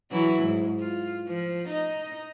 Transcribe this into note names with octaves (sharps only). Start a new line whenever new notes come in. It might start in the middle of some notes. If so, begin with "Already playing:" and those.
E3 F#3 E4
G#2
F4
F3
D#4 D#5